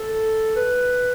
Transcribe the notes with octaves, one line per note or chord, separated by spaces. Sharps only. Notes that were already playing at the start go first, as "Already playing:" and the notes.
Already playing: A4
B4